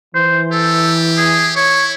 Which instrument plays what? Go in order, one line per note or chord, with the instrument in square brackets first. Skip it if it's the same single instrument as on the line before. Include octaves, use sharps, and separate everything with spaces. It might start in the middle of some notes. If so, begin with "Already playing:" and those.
[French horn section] E3 [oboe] C5
[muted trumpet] G4 [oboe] A4
[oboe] G#4
[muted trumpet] E4 [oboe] C#5